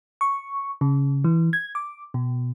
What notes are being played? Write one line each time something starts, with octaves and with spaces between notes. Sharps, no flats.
C#6
C#3
E3
G#6
D6
B2